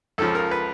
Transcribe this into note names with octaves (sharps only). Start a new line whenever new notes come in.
C#2 C#3 F3 A4
A#4
B4